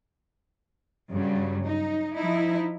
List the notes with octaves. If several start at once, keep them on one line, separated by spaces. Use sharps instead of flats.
G2 C#3 F#3 G3
D#4
F3 D#4 E4